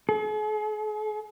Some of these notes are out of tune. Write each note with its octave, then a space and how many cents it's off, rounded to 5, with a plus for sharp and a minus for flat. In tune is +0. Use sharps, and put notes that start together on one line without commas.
G#4 +45